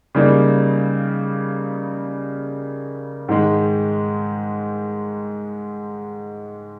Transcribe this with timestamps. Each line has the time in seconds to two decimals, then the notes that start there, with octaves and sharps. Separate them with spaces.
0.15 C#3 G3 A#3 D#4
3.28 G#2 D#3 G#3